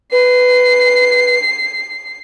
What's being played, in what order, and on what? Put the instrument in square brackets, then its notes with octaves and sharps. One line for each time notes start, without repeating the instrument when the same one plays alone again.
[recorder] B4 [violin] C7